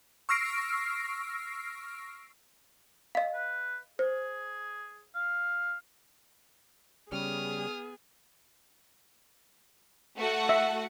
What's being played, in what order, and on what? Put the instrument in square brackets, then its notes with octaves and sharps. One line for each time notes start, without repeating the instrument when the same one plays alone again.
[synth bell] C#6 E6 F6 A#6 C7 D7
[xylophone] D#5 F5
[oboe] B4
[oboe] G#4 [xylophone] C5
[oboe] F5
[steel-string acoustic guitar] C#3 G3 C#4 [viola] B3 G#4 [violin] D#6 F6
[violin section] A3 F#4 F#5
[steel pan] E5